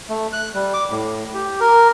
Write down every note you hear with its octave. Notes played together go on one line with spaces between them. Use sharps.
A3
F#6
G3
D6
A2
G4
A#4